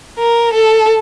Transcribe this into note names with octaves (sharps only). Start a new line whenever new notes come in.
A#4
A4